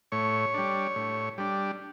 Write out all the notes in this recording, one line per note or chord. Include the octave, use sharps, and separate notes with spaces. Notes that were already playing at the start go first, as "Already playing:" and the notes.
A2 C#5
G3 D4
A2
G3 D4